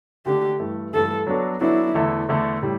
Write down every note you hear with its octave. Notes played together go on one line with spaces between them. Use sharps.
D3 A3 D4 G4
G2 E3 A3
G2 E3 A3 A4
F#3 B3 D4 F#4 A4
F#3 B3 D4 E4 F#4 A4
E2 D3 A3 E4 A4
E2 D3 A3 E4 A4
A2 G3